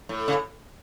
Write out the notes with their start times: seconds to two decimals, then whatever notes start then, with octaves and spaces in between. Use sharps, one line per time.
0.09 A2
0.28 C#3